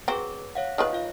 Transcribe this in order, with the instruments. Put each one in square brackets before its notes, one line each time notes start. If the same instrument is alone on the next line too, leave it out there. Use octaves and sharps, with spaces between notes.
[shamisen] F#3 C4 [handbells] G#4 B4 D6
[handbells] C#5 F5 F#5
[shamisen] D#3 F3 B4 [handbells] C#5
[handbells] F4 F5